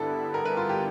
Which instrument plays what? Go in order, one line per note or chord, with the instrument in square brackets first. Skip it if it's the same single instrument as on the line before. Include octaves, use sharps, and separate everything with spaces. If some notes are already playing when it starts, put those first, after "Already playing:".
Already playing: [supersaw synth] G2 D3 G3 B3 E4 [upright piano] A4
[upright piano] A#4
B4
F4
G4